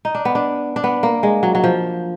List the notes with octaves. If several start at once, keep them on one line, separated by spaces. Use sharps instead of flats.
D#4
D4
B3
D4
D4
B3
A#3
G#3
F#3
F#3
F3